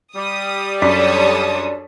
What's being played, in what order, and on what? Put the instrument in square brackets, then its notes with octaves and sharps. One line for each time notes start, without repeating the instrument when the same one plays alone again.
[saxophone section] G3 [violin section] D#6
[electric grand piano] F#2 B6 [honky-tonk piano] D4 [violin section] A4 C#5 D#6